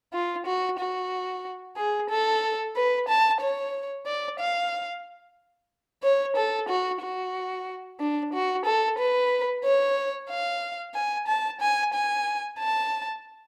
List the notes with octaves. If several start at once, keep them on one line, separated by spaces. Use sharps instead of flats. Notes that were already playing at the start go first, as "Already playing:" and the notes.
F4
F#4
F#4
G#4
A4
B4
A5
C#5
D5
F5
C#5
A4
F#4
F#4
D4
F#4
A4
B4
C#5
F5
G#5
A5
G#5
G#5
A5